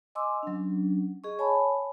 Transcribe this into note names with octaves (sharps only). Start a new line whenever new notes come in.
D#5 G#5 C6 D6 E6
F#3 C#4 D4
G#4 D#5 C#6
C#5 G#5 A5 B5